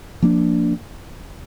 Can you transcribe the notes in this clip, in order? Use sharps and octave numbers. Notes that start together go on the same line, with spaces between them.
F3 A#3 D4